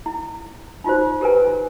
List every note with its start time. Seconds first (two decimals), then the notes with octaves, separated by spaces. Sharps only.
0.06 E4
0.84 D#4 F4 F#4 C5
1.21 G4 A#4 B4 G#5